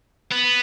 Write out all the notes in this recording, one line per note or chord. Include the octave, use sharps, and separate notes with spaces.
B3